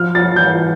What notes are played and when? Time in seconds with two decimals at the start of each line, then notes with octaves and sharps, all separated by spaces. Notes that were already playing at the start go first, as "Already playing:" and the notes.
Already playing: F3 F6
0.15 A6
0.36 E3 G6